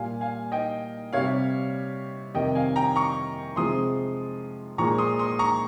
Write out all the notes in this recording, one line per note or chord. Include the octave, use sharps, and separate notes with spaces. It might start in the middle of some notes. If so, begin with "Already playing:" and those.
Already playing: A#2 G3 F5 G#5
F5 G#5
D#5 G5
C3 G3 C#5 F5
F2 C3 D#3 G3 D#5 G5
F5 G#5
G5 A#5
A#5 C#6
C3 F3 G#3 C6 D#6
A#2 F3 G#3 A#5 C#6
C6 D#6
C6 D#6
A#5 C#6